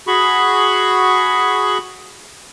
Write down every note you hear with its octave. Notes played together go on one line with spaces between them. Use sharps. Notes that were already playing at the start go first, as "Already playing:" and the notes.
F#4 G#4 B5 C#6